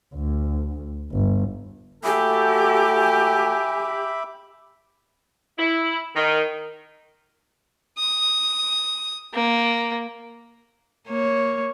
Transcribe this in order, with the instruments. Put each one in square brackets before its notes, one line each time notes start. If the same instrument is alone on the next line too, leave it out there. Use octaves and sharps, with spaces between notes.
[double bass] D2
G1
[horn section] A3 F#4 A4 [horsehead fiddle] G4 [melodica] E5 B5 D6 [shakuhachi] G#5
[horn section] E4
D#3
[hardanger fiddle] D#6
A#3
[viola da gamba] A#3 C#5